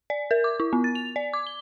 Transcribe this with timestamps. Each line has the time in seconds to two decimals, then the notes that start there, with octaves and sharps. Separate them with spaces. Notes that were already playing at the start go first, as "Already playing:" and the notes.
0.10 D5
0.31 A#4
0.44 D6
0.60 E4
0.73 B3
0.84 A6
0.95 F7
1.16 D5
1.34 D6
1.47 G7